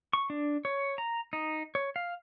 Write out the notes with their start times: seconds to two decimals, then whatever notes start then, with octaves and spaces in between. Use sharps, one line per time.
0.13 C#6
0.30 D4
0.65 C#5
0.98 A#5
1.33 D#4
1.75 C#5
1.96 F5